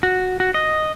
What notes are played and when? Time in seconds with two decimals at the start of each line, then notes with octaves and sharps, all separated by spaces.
0.03 F#4
0.40 F#4
0.54 D#5